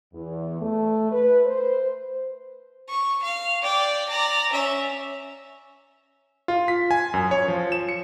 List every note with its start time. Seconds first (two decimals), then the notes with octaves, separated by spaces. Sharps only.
0.14 E2
0.62 A3
1.11 B4
1.45 C5
2.89 C#6
3.23 F5
3.63 D5 G5
4.09 D5 A#5
4.52 C#4 E5
6.48 F4
6.68 B6
6.91 G#5
7.14 F#2
7.31 C#5
7.48 F3
7.72 E7
7.89 C#7